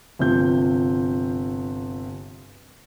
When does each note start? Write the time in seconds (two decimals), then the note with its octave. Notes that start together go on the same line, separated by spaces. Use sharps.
0.19 G1 C3 F3 G6